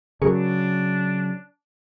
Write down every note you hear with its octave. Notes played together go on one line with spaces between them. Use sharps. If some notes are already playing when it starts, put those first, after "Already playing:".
C#3 F#3 D4 G#4 A#4 C#6